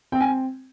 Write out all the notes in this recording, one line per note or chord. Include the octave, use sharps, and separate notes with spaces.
C4 G5
G#5